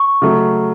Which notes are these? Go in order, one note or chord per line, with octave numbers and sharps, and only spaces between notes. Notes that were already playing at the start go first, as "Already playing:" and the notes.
Already playing: C#6
C#3 F#3 A3